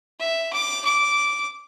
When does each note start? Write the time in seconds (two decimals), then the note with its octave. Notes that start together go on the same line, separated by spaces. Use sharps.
0.20 E5
0.53 D6
0.85 D6